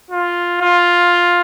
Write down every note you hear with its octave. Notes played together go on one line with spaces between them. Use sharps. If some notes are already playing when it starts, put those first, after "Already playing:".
F4
F4